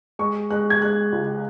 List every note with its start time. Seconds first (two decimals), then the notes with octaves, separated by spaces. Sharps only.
0.19 G#3 C#6
0.50 G#3 F#6
0.70 G#6
0.82 G#3 F#6
1.12 C#2